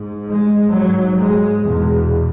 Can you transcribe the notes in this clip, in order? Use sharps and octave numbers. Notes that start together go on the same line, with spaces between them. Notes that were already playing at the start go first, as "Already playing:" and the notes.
Already playing: G#2
G#3
G#2 F#3
G#3
E2 B2 G#3